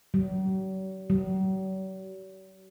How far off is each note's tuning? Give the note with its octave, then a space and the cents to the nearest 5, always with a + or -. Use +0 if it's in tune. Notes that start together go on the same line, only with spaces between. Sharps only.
F#3 +45
F#3 +45